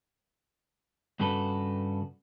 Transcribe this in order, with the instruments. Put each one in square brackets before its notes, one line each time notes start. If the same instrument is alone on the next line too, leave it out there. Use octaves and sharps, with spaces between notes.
[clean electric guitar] G2 C#3 F#4 A4 B4